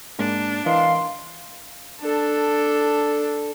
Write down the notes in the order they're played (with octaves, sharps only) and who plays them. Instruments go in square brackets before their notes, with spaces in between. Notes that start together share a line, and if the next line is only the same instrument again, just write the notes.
[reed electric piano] G#2 G#3 A#3 [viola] D4
[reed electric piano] E3 A#4 D#5 [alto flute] F5 [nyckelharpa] C6
[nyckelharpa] D4 A4